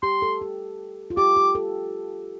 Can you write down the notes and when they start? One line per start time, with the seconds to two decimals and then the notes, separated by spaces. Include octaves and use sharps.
0.03 G4 C6
0.22 A4
0.42 G4
1.10 F4
1.17 G4 D6
1.37 G4
1.55 A4